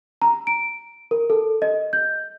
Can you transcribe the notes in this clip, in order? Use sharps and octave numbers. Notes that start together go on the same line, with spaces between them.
A#5
D7
A#4
A4
D#5
G6